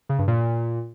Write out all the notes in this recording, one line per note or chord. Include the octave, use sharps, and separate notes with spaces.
C#3
G2
A#2